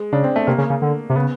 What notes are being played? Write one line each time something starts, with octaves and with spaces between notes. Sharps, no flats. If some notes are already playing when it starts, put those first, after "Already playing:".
Already playing: G#3
C#3 D4
C4
A3
C3 A#3
C#3
C#3
D3
C3
C#3 B3